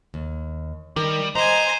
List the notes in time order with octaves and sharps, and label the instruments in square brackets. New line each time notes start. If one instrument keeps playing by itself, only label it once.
[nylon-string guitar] D#2
[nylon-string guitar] D#3 A#4 [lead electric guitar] G3
[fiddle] C5 G#5 [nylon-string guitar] D#5 [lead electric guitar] A#5